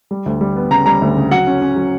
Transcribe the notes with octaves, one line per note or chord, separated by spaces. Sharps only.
G3
D2
G3
B3
C#3 A#5
G3 A#5
D2
C#3
F#3 F#5
C#4
C#4
F#3